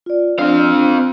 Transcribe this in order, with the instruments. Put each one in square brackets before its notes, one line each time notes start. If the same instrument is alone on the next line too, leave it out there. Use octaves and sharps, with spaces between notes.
[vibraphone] F4 D5
[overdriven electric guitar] C4 F5 [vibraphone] D4 F4